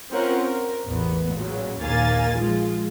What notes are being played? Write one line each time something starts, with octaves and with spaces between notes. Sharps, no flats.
C4 C#4 F4 A#4 C5 F#5
A#4
A1 E2 B3
A#2 C#3 F#3
A#1 D#2 A#3 F5 G#5 A6
F3 G#3 F4